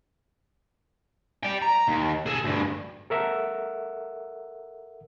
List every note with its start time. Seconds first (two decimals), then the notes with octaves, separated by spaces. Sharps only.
1.44 D5 G5
1.62 A#5
1.88 D#2
2.26 G#4 A4
2.44 D2 G2
3.10 A4 A#4 E5 F#5